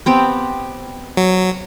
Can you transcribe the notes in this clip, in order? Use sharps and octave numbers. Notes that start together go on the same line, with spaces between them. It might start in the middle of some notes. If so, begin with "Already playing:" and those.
B3 C4 G4
F#3